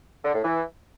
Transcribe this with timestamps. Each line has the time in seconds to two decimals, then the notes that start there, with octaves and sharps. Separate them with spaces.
0.24 D3
0.34 A2
0.44 E3